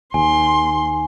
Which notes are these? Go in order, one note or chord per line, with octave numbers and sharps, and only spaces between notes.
D#2 G#5 C6